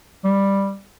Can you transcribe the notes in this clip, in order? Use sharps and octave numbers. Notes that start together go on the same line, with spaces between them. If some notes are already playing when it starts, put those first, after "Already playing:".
G3